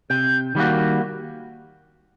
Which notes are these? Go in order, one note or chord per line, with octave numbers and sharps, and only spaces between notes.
C3 G6
D#3 G3 A#3 F#4